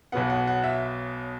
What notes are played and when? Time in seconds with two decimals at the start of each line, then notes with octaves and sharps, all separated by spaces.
0.12 B1 B2 F#3 B3 F#5
0.30 F#5
0.47 F#5
0.64 E5